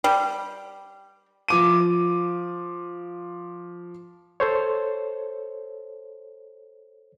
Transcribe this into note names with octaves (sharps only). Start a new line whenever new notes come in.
G3
F3 D6 D#7
A4 C5 C#5